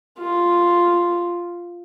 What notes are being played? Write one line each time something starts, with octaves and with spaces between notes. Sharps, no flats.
F4